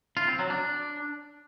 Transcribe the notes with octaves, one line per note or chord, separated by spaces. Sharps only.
F4
C4
F#3
D4